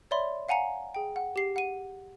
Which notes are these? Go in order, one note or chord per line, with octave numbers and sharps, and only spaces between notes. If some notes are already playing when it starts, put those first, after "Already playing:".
C#5 D5 E5 B5 C6
F5 F#5 G#5 A#5 C#7
G#4 G5
F#5
G4 C7
F#5 D#7